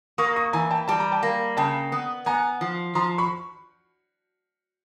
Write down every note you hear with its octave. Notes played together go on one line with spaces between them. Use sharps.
A#3 C#6 D#6
C#6 D#6
E3 G#5 A#5
G5 A5
G3 A5
A#5
G5 A5
A#3
C#3 G5 A5
B3
B3 G#5 A#5
F3
F3 A#5 C6
B5 C#6